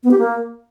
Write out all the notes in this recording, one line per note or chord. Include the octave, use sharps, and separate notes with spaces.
B3
G4
A#3